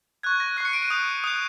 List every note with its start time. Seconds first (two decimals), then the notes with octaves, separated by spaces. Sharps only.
0.23 C#6 F#6 G#6
0.40 A#6
0.57 F#6 C7
0.61 C#6 C#7
0.73 D7
0.82 D#7
0.90 D#6 G6
1.24 D#6 G6